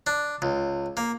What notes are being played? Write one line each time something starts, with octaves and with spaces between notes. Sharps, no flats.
D4
C#2
A#3